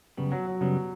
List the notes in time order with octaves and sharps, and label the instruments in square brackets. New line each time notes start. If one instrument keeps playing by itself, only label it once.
[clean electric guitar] F#2 C#3 G3 B3
[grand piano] F#3
F#3
[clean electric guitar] F#2 C#3 G3 B3 [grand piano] F#3